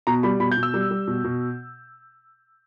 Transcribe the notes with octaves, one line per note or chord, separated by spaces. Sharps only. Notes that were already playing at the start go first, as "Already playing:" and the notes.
B2 A#5
G3 B5
B2 B5
G6
B2
E6
G3
G3
B2
B2